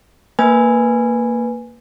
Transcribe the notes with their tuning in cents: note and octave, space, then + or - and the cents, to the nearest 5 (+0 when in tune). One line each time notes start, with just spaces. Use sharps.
A#3 -10 B4 +0 G#5 -5